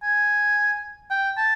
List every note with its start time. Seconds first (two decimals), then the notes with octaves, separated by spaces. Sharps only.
0.03 G#5
1.10 G5
1.37 A5